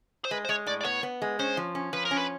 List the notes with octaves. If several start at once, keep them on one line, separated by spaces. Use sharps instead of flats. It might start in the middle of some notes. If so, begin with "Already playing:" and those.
C5
G#3 B4
C5
G#3 C#5
A2 D5
D5
B3 C#5
B3
G#3
C#4 C5
F3
C#4
F3 B4
A#4
C#4
B4